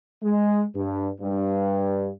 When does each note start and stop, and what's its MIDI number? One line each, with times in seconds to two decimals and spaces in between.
0.23 0.64 56
0.75 1.09 43
1.21 2.10 43